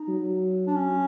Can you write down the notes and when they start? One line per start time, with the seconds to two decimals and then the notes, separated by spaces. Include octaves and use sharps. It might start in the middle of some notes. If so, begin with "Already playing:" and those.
Already playing: D#4
0.09 F#3
0.67 D4
0.76 C#4